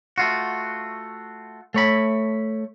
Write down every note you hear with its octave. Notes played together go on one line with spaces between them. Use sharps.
A3 F4 F#4
A3 C#5 B5